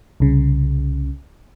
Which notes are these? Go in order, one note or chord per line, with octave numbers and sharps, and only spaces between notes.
C2 C#3